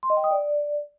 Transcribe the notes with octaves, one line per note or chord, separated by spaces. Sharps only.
C6
D#5
G5
D#6
D5